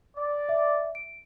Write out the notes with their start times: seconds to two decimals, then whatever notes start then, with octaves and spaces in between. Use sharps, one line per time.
0.16 D5
0.49 E5
0.95 D7